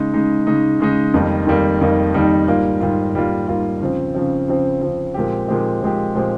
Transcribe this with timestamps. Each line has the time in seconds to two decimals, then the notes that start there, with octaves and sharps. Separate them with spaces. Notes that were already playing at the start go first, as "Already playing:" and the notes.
Already playing: C#3 G#3 D#4
0.14 C#3 G#3 D#4
0.47 C#3 G#3 D#4
0.80 C#3 G#3 D#4
1.14 F2 D#3 G3 A#3 D#4
1.47 F2 D#3 G3 A#3 D#4
1.81 F2 D#3 G3 A#3 D#4
2.14 F2 D#3 G3 A#3 D#4
2.48 G#2 G3 A#3 F4
2.81 G#2 G3 A#3 F4
3.15 G#2 G3 A#3 F4
3.48 G#2 G3 A#3 F4
3.81 C#3 F3 C4
4.14 C#3 F3 C4
4.48 C#3 F3 C4
4.81 C#3 F3 C4
5.14 A#2 F3 G#3 C4 G4
5.48 A#2 F3 G#3 C4 G4
5.82 A#2 F3 G#3 C4 G4
6.15 A#2 F3 G#3 C4 G4